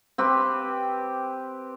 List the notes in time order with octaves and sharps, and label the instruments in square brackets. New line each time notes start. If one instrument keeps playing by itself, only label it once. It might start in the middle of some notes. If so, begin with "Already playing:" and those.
[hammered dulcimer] C4 G4 B4